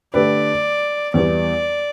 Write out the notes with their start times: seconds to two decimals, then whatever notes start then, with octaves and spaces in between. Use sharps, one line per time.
0.14 D3 A3 G4 B4 D5
1.14 E2 E3 G3 B3 D5